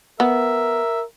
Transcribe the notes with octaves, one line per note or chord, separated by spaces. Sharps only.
B3 A#4 E5